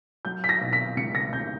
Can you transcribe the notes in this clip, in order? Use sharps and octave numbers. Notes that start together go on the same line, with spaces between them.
F#3 G6
B6
A#6
B2
B6
C#2 C#7
A#6
C#2 G6